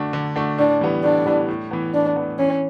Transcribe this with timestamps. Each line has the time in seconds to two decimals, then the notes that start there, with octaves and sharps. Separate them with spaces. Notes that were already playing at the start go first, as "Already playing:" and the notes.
Already playing: D3 A3 D4 F#4
0.13 D3
0.36 A3 D4 F#4
0.58 A2 D4
0.81 E3 G3 B3
1.04 A2 D4
1.26 E3 G3 B3
1.48 A2
1.71 E3 B3
1.94 A2 D4
2.16 E3 B3
2.39 E3 C#4